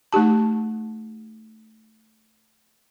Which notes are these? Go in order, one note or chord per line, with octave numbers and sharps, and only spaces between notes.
A3 D#4 G4 A5